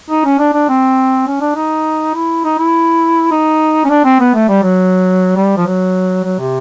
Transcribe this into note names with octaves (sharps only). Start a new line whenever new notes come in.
D#4
C#4
D4
D4
C4
C#4
D4
D#4
E4
D#4
E4
D#4
C#4
D4
C4
B3
A3
G3
F#3
G3
F3
F#3
F#3
C3